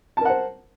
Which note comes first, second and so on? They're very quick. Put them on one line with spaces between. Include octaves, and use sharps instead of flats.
A5 A#4 F#5 C5